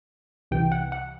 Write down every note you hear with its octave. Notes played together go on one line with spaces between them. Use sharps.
C2 C3 E3 G5
F#5
F#5